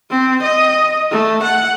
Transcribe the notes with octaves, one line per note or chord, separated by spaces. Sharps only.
C4
D#5
A3
F#5